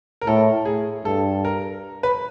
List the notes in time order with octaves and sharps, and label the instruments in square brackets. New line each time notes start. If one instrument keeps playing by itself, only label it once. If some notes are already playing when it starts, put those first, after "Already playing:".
[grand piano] A#4
[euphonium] A2 [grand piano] A4
[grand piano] G#4
[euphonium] G2 [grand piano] A4
[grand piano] A#4
B4